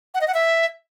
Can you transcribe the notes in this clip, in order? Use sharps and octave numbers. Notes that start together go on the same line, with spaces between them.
F#5
D#5
F#5
E5